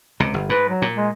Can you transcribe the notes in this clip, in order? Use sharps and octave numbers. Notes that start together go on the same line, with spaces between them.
C#2 C3
G1
G#2 B4
F#3
A#2
G#3